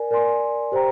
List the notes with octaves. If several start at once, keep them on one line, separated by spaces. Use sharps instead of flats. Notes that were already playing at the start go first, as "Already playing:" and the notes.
Already playing: A#4 D5 G#5
A#4 D5 G#5 C6
G4 C5 G5 A#5